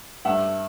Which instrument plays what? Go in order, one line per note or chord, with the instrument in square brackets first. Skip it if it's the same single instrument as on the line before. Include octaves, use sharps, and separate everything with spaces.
[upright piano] G2 E5 F#5